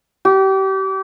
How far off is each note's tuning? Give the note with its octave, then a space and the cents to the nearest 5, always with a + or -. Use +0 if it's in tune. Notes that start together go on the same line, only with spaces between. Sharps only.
G4 -30